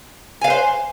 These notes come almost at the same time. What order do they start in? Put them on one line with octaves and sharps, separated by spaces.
G#5 F5 B4 C5